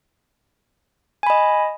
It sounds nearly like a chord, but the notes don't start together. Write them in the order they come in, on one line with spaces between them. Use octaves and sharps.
G#5 B5 D#5